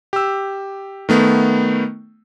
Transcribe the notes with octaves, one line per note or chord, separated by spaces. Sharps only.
G4 E6
D#3 A3 B3